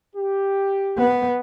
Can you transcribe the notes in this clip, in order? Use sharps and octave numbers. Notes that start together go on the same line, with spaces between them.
G4
B3